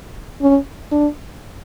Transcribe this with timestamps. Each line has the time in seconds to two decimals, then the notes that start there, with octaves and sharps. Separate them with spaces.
0.41 C#4
0.91 D4